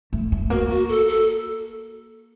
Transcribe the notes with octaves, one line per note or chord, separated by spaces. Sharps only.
A3
A3
A#3 F#4
F#4
A4
A4